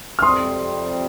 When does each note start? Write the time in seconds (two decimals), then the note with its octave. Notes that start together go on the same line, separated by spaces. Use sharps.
0.19 F6
0.22 F2 C3 G3 C4 C6 D#6